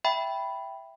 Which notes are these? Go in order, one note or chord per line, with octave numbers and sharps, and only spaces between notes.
E5 G5 B5